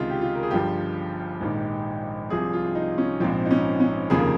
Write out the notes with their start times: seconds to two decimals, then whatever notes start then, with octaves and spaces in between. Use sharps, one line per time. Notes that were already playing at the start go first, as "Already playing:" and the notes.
Already playing: C#2 C3 D#3 F4 G#4
0.10 G4
0.21 F4
0.35 A#4
0.43 G#4
0.51 G1 G2 F3 G4
1.41 A#1 G#2 D#3
2.30 C2 C3 F3 G#4
2.53 F4
2.75 D#4
2.98 C#4
3.20 A#1 G#2 F3 C4
3.45 D#4
3.51 C#4
3.80 C#4
4.10 F1 D#2 C#3 F3 G#4
4.19 A#4